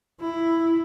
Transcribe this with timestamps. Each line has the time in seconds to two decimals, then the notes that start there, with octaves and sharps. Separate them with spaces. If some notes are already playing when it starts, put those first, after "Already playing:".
0.21 E4